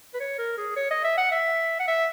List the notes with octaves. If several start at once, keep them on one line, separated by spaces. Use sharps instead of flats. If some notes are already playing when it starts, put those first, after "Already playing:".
B4
C#5
A#4
G#4
C#5
D#5
E5
F#5
E5
F#5
E5